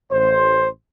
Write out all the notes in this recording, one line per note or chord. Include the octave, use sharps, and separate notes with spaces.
A1 C5